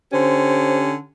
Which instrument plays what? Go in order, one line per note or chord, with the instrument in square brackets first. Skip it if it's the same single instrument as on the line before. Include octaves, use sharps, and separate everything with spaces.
[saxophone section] D3 C#4 G4 [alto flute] C5